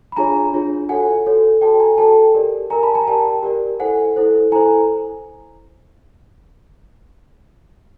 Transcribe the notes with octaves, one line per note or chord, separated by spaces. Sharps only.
B5
D4 F4 G#4 C#5 G#5 A#5
D4 F4 G#4 C#5
F#4 A4 C#5 F#5 G#5
F#4 A4 C#5
F#4 A4 C#5 G5 A5
G#5 A#5
F#4 A4 C#5 G5 A5
G4 A#4 D5
G4 A#4 D5 G#5 A#5
A5 B5
G#5 A#5
G4 A#4 D5 G5 A5
G4 A#4 D5
E4 A4 C5 F#5 G#5
E4 A4 C5
E4 A4 C5 G#5 A#5